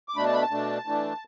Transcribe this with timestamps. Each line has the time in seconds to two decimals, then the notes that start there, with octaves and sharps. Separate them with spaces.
0.09 D6
0.16 B2 A3 D4 B5
0.25 A5
0.33 B5
0.42 A5
0.51 B2 A3 D4
0.85 E3 A3 D4